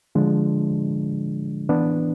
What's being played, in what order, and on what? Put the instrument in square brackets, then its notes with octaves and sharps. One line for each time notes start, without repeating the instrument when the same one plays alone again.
[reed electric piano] D3 F3 G#3 D4
E3 B3 D4